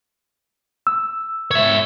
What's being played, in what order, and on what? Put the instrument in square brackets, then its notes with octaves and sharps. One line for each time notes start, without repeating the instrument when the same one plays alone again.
[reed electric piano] E6
[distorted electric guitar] C#5 E5